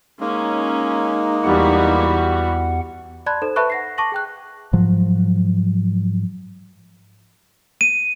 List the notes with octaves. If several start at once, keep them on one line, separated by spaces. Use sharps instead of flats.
G#3 A#3 C#4 D#4
E2 E3 G3 F#4 F#5
D5 A5 B5 C6 F#6 G#6
D#4 A4 C5 E7
B4 E5 A5 B5 C#6 F#6
F#5 A#6 C7
A5 C#6 D6 A#6 F#7
G#4 G5 F#6
G#2 F3 F#3
D#7